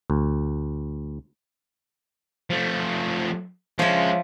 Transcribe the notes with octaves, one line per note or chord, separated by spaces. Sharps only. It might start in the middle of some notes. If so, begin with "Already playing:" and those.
D2
F3 A3
F3 G#3 C#4 E5